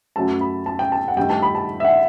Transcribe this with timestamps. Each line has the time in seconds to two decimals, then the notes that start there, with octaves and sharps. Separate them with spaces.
0.16 F#2 F#3 A3 A5
0.41 B5
0.66 A5
0.79 G5
0.92 A5
1.08 F#5
1.17 G2 D#3 A3 G5
1.30 A5
1.42 B5
1.55 A5
1.80 E5
1.84 F#5